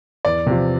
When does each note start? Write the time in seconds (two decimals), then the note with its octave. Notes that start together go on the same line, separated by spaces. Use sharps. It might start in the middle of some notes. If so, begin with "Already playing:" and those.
0.25 E2 D5
0.47 C3 F3